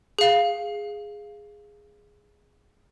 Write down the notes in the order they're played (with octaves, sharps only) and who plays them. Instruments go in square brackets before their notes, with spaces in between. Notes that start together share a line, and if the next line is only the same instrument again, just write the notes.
[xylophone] G#4 F5